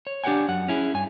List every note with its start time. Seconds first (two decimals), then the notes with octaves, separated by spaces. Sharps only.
0.07 C#5
0.24 D4 G4 A4 C#5 F#5 G#5
0.48 F#2 F#5
0.68 C#4 E4 G#4
0.94 G2 G#5